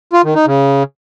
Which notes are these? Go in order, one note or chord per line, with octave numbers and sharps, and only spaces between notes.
F4
D#3
D#4
C#3